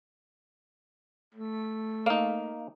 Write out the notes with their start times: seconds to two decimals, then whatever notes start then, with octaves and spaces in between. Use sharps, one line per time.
1.35 A3
2.06 A#3 D#4 F5